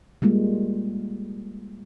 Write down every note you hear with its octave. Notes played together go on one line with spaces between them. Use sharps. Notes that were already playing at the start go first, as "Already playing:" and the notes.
G3 G#3 A#3 F4